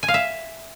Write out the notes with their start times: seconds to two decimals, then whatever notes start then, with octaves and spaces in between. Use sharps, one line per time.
0.03 G#5
0.08 F5
0.14 E5